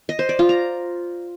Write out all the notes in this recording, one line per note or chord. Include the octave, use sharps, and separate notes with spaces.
D#5
C5
D5
F4
A#5